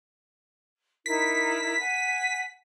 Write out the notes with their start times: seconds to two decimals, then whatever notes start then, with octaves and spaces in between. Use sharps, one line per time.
1.06 D#4 E4 A#4 B6
1.79 F#5 G#5